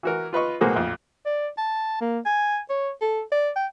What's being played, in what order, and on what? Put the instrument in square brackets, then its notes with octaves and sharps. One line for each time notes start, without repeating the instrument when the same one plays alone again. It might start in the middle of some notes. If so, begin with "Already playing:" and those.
[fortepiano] E3 F#4 A#4
F4 B4 D#5 C#6
B1 A2 A#3 F#4 G#4 C5
A#1 F2
[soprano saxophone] D5
A5
A#3
G#5
C#5
A4
D5
G5